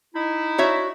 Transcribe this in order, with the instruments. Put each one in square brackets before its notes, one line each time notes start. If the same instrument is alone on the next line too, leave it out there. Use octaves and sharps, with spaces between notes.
[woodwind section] D#4 E4
[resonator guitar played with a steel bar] F#4 C#5 E5